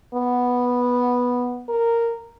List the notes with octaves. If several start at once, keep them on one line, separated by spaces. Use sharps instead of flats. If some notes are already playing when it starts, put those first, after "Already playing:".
B3
A#4